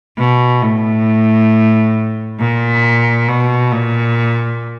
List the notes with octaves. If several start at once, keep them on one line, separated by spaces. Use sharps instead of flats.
B2
A2
A#2
B2
A#2